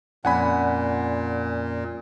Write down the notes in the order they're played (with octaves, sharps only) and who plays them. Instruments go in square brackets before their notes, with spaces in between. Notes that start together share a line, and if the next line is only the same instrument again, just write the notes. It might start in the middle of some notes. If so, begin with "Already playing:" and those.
[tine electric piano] F2 C#4 D5 [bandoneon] A#2 [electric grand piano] F#5 G#5 B5